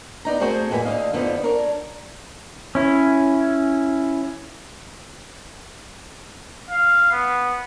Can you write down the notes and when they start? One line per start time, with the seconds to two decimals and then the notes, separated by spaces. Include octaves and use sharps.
0.25 B3 D4 D#4 A#5
0.40 A3 C4 F#4 G#4 A#4 C5
0.70 F2 A#2 G#3 A#4 B4 G#5
0.85 D2 D3 E3 D#5 F5
1.13 F2 D3 F3 B3 D#4 F4
1.43 D4 A#4 C#5
2.75 C#4 E4
6.71 F5
7.12 B3